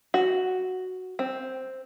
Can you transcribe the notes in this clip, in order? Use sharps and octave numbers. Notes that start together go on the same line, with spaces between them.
F#4
C4